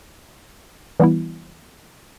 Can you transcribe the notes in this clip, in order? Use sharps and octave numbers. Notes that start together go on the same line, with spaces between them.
E3 G3 B3 E4